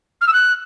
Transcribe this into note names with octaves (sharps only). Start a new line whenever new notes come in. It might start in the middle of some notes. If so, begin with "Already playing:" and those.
F6
E6
F#6